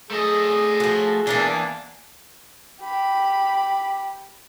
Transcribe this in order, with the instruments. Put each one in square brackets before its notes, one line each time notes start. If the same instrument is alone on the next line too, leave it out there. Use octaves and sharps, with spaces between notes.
[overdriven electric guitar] A3 D#5 [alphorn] G#4
[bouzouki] F3 F#4
[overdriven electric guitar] E2 [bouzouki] E3 A#3 D4
[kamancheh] G4 B5